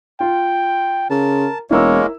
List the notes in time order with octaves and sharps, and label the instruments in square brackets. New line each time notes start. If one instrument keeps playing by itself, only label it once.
[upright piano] F4 [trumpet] G5
[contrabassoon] C#3 [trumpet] A#4 [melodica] A5
[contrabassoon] E1 [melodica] G#3 A#3 [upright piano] E4 A#4 E6 [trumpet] C#5